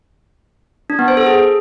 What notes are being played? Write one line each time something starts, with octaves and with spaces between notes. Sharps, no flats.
D4
B3
C5
A4
G#4